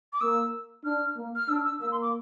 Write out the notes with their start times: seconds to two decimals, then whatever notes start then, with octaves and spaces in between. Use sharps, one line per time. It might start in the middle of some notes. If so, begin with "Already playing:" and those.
0.13 D6
0.21 A#3 E6
0.85 D4 F6
1.17 A#3
1.36 F6
1.49 D4 E6
1.65 E6
1.81 A#3 E6
1.92 C6
2.02 D6